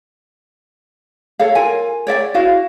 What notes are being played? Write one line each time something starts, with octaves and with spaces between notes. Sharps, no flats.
A4 C#5 F5
F4 A#4 G#5
C#5 D5 E5 G5
E4 F#4 F5